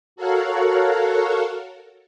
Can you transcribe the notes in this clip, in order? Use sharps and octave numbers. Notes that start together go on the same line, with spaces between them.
F#4 A4 A#4 C#5 F5 F#5